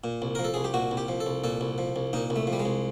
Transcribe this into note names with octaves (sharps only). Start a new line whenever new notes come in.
A#2
C2
F3 A#4
A4
C2 G#4
G4
A#2 F#4
C2
G4
F3
A4
C2
A#2 A4
C2
F3
C2
A#2 D#4
C2
A3
F3
G3
G#3
C2